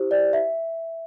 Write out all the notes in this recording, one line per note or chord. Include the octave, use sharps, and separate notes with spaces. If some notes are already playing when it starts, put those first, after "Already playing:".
Already playing: E4 G4 C5
D5
E5